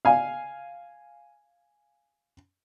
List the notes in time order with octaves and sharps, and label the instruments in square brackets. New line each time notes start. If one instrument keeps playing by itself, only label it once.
[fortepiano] F5 G#5